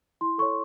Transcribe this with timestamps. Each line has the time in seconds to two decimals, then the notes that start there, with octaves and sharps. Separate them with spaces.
0.21 E4 C6
0.38 A4 C#5 C#6